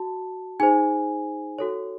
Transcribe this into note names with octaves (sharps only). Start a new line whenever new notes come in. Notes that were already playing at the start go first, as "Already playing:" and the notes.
Already playing: F#4 A5
D#4 G#4 C5 G#5
F#4 A4 C#5